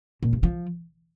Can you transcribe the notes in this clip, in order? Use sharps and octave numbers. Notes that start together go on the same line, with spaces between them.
A#2
G2
F3